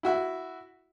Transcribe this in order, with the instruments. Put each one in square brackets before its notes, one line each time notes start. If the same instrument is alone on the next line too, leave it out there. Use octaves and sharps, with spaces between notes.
[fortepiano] E4 F#4 E5